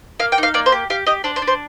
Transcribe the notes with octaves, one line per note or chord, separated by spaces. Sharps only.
A#3 F5
G5
D#4
F5
A#3 D5
C5
G4
G4 F5
G4 D#5
D4 C5
C5
D4
C5